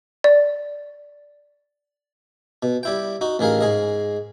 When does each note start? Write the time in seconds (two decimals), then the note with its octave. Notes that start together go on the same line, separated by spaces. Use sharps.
0.24 D5
2.63 B2
2.83 G3 E4 G5
3.21 D#4 F#4
3.39 A1 D#3 G#4 A#4 F5
3.61 G#2 G#4 D#5